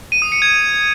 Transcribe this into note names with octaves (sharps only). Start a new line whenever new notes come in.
D#7
D#6
C#7
G#6